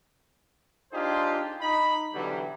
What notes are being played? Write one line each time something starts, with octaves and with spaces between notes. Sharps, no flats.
D4 D#4 F4 G4 G#4 C5
D#4 B5
B2 D3 E3 F#3 G3